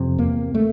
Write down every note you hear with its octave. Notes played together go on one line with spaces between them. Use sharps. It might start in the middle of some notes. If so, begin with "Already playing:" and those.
Already playing: F2 C3
E2 A#3
A3